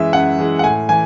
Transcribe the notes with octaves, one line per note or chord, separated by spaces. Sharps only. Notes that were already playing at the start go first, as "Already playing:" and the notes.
Already playing: F#2 E3 G#3 E5
F#2 F#5
E3 G#3
F#5
A2 G#5
E3 G#5